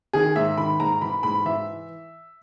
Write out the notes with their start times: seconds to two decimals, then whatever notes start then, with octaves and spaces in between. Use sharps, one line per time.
0.13 D#3 G#4
0.36 G#2 E5
0.58 D#3 B5
0.80 G#2 A#5
1.01 E3 B5
1.23 G#2 B5
1.45 E3 E5